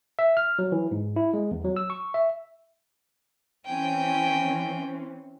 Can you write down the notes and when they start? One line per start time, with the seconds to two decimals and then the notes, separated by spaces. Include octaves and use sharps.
0.19 E5
0.37 F6
0.59 F#3
0.72 E3
0.91 G#2
1.16 E4
1.34 G#3
1.51 E2
1.65 F#3
1.76 E6
1.90 C#6
2.14 E5
3.66 E3 C4 C#4 G5 G#5